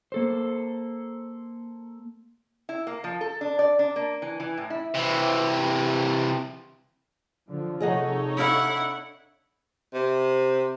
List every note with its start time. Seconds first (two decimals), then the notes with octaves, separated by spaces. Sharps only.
0.12 A#3 A4 C5
2.69 E4
2.87 A#3
3.04 F3
3.21 A4
3.41 D4
3.59 D5
3.79 D4
3.96 A#3
4.22 E3
4.40 E3
4.57 A2
4.70 E4
4.95 C3 E3
7.51 D3 F3
7.80 C3 D#4 G#4 A4 C#5 D#5 F#5
8.37 D4 E4 F5 F#5
9.94 C3